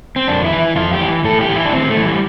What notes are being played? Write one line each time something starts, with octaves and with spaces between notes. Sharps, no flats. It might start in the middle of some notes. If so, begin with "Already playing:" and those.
C4
F2 D4
E4
E3
E4
F2 F4
G4
E3
A2 A4
G4
E3
E4
D4
A2 C4
A3
E3
G3